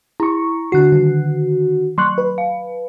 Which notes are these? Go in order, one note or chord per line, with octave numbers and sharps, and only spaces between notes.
E4 A#5 C#6
D3 F#4 F#6 C7
D#3
F#3 C6 C#6 F#6
B4
F5